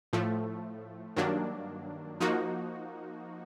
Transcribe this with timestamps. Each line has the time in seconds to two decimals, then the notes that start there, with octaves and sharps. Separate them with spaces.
0.13 A2 F3 A3
1.17 G2 D#3 F#3 A#3 D4
2.21 F3 A#3 D#4 F#4